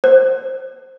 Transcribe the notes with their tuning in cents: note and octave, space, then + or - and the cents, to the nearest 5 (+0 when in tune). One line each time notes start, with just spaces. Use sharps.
C5 +10